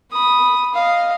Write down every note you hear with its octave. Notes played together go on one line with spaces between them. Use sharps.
B5 D#6
D#5 F5